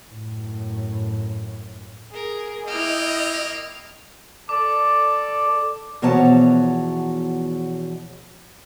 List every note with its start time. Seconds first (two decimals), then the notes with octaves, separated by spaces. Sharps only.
0.11 F#2 A2
2.13 G#4 A#4
2.68 A#3 E4 D#5 G5 F6
4.49 A4 D5 D6
6.02 E2 B2 F3 C#5 A5 A#5